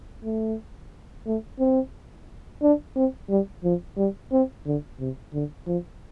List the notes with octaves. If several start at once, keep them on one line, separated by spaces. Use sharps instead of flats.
A3
A3
C4
D4
C4
G3
F3
G3
C4
D3
C3
D3
F3